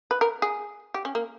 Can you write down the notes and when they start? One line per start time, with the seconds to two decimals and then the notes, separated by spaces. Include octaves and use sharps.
0.11 B4
0.21 A#4
0.42 G#4
0.94 G4
1.05 C#4
1.15 A#3